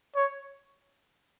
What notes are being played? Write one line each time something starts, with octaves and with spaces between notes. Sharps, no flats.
C#5